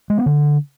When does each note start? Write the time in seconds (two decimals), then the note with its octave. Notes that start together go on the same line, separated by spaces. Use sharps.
0.10 G#3
0.18 B3
0.26 D3